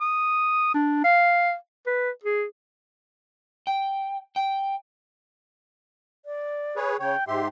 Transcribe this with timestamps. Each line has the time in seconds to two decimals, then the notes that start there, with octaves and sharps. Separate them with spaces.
0.01 D#6
0.74 D4
1.04 F5
1.86 B4
2.23 G#4
3.67 G5
4.36 G5
6.25 D5
6.76 G#4 B4 C#5
7.00 C#3 C#5 G5
7.27 G#2 G4 E5 C6